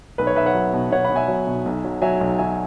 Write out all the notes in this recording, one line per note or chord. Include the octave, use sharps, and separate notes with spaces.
B1 B4
C#5
B1 B4 E5
C#5 F#5
F#3
B2
B2 C#5 F#5
F#5 B5
B2
E5 G#5
F#3
B2
B1
F#3
F#3 E5 G#5
B1
F#3 E5 G#5